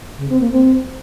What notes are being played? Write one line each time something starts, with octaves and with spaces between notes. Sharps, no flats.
C#3
C4
A#3
C4